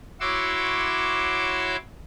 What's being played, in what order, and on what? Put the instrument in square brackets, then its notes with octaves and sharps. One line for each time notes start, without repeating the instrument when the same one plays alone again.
[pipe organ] E4 F#4 C#5 C6 D6 E6